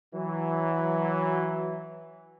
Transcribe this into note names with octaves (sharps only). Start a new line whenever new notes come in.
E3 F#3